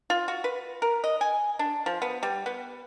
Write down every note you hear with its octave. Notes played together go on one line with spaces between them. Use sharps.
F4
F#4
B4
A#4
D#5
G#5
D4
F3
B3
G3
B3